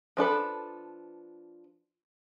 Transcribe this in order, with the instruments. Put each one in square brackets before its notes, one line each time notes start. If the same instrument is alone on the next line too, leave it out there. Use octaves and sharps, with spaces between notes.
[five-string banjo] F3 D4 A4 B4